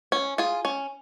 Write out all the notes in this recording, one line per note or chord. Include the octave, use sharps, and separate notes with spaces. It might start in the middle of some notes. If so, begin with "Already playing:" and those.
C#4
F4 G#4
C#4